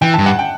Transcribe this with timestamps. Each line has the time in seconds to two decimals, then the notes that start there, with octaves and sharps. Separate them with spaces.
0.02 E3 G5
0.14 G2 A5
0.26 F#5
0.39 G5